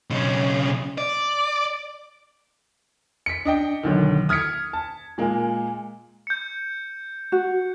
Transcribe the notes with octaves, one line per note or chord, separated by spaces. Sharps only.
B1 C#3
D5
B6 C#7
D4 D#5 G5
B1 D3 D#3
D#6 F6 G#6 B6 C#7
A5
A#2 G#3 A#3
G6 C#7
F#4